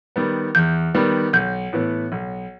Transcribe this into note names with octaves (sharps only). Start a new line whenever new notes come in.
D#3 G3 B3
E2 G6
D#3 G3 B3
B1 G6
A2 E3 B3
B1